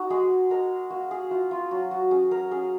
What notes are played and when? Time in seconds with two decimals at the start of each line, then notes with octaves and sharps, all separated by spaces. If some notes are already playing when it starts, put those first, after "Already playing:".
Already playing: D#4 F#4
0.10 G#3 G#4
0.50 G#3 A#4
0.90 A#3 F#4
1.11 G#4
1.31 F4 F#4
1.51 F4
1.71 F#3 F#4
1.91 F#4
2.11 C#4 G#4
2.31 A#4
2.51 C#4 G#4